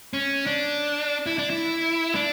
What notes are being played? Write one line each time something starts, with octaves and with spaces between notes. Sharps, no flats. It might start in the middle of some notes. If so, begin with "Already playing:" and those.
C#4
D4
E4
D4
E4
D4